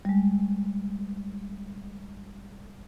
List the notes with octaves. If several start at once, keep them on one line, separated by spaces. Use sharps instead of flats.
G3 G#3